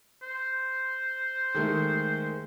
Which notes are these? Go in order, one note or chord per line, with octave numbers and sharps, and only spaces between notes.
C5
D#3 G#3 A3